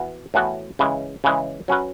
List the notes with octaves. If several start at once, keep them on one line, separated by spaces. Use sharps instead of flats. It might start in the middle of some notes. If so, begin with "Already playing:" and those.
Already playing: E3 B3 F#4
A2 E3 B3 F#4
C#3 E3 G#3
C#3 E3 G#3
F#3 C#4 F#4 B4